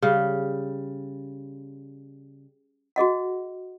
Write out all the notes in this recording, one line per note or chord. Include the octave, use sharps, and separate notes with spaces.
C#3 G3
F#4 G#4 D#5 F#5